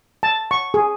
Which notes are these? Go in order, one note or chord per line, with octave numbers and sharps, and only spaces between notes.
A5
C#6
G#4